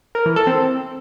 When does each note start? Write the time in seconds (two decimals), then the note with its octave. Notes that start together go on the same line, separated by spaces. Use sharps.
0.15 A#4
0.26 E3
0.36 A4
0.47 C4